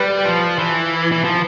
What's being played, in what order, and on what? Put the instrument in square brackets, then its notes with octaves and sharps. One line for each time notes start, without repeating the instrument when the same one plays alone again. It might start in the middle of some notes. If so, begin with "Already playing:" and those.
Already playing: [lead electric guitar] G3 [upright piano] B4
[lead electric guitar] F3
E3
E3
F3